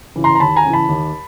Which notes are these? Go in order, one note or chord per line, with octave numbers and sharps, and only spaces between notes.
C#3 E3
A#5 C6
A#5
D#2 A5 B5
G#5 A#5
C#3 E3
A5 B5
D#2